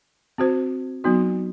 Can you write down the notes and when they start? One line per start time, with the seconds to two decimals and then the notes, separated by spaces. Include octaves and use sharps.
0.38 C4 F#4 C5
1.04 F#3 B3 D#4 F#4